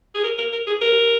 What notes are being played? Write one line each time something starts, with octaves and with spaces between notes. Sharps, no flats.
G#4
A#4
A#4
A#4
G#4
A#4